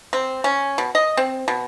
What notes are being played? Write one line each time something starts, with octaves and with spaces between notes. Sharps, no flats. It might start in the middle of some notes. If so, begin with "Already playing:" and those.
C4
C#4
B2
D#5
C4
B2